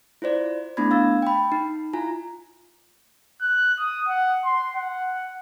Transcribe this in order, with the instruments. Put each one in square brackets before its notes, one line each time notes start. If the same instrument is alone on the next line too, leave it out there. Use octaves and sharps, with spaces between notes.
[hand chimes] E4 F4 C5 D5
A3 B3 D4 E4 B5 G#6
F5 E6 A6
G5 B5
D#4
E4 F4 G#5 A#5
[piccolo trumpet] F#6
D#6
F#5
C6
F#5